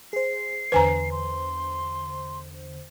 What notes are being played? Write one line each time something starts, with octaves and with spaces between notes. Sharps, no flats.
G#4 C5 C7
E2 D3 B4 C5 G#5 A#5
C6